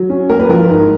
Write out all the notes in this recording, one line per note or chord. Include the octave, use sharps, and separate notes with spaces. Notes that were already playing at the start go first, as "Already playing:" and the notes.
Already playing: F#3
C#4
A#3 A#4
B4
F3 A#4
G#2